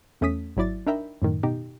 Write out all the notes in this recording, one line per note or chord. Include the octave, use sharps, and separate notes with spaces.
E2 A3 C#4 D#6 B6
G#1 F#3 E4 D5 A6
D4 D#4 A#4 E5 G5 B5
F#2 A2 D#3
B2 D#4 G4